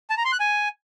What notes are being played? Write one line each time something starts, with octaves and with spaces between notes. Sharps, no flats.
A5
A#5
C6
F#6
G#5